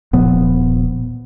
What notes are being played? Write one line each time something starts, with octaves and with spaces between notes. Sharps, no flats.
D#1 A#2 F3 B3